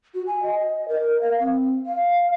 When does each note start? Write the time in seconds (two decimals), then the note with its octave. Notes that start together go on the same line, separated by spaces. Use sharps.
0.14 F#4
0.27 G#5
0.43 D#5
0.88 A#4
1.21 F5
1.40 C4
1.86 F5